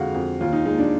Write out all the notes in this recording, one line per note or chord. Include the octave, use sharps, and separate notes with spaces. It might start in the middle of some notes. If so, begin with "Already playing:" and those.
Already playing: F2 D3 G#3 F#4 F5
F2
D#2 F4
D#4
G#3 D#4
D4